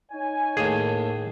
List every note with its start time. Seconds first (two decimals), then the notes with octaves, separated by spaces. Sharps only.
0.12 D#4 C#5 G#5
0.57 D#2 A2 A#3 G#4